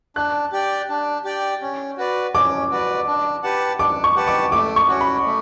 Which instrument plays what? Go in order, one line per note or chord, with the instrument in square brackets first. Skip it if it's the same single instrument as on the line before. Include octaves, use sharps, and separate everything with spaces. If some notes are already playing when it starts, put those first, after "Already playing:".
[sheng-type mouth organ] D4 [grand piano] F#6
[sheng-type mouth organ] G4 D5 G5
D4
G4 D5 G5
C#4
F#4 B4 D5
[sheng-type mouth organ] C#4 [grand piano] D6
[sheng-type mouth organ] F#4 B4 D5
D4
G4 B4 F#5 A5
[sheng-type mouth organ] D4 [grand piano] D6
[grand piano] C#6
[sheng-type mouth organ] G4 B4 F#5 A5
[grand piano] D6
[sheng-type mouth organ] A3 [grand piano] D6
[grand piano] C#6
[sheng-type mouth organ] C#4 F#4
[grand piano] B5
[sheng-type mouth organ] A3